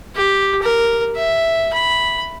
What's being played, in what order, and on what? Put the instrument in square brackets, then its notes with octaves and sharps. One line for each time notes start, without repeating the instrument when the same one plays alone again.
[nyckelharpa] G4
A#4
E5
B5